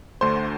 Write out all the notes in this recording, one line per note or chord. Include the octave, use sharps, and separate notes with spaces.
D2 D3 A3 C5 C6